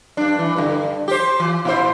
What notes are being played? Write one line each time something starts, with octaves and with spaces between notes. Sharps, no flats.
G2 D4
E3
G2 D3
G4 C5
E3
A#2 E4 C5